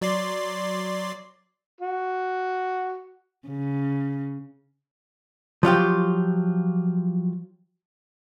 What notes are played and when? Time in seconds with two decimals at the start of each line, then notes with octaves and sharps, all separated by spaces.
0.01 F#3 D5 C6
1.81 F#4
3.47 C#3
5.63 F3 F#3 F4 G4